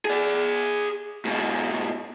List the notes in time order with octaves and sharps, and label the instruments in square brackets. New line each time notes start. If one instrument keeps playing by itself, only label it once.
[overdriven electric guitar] G#4 D5
G#2 B2